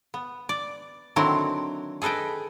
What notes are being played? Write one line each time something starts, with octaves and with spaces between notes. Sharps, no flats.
B3
D5
D3 D#3 F#3 C4 E4
G#4 A4 B4 D#5 G5